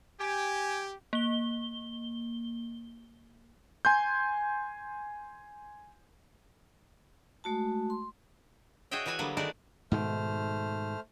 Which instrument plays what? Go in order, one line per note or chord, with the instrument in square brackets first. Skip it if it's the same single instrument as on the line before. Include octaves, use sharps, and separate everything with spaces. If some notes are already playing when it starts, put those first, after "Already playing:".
[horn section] G4 [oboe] G#5
[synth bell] A#3 G7
[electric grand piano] G#5 C6 G6
[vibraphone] G#3 A3 F#4 A5
C6
[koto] F#4 G#4 C#5 D#5 E5 G5
E3 F#4 B4 E5 G#5
D3 F#3 G3 A#3 B3
D#3 G#3 A3 F#4 A#4 D5
[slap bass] G#2 B2 D#3 [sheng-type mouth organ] A3 C5 F6